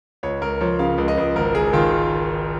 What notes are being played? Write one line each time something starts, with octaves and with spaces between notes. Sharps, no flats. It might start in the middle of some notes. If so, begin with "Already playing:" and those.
C#2 C#5
C#2 A#4
F3 C#5
C#3 F5
C#2
D#5
C#2
G#1 A#4
G#1 G#4
D#3 F4